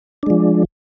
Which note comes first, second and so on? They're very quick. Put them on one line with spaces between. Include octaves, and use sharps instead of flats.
D4 G#3 F3